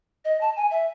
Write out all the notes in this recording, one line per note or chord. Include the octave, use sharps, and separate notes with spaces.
D#5
A5
G#5
E5